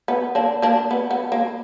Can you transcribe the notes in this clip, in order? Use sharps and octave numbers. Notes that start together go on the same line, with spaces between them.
B3
A#3 D4
A#3 D4
B3
B3
A#3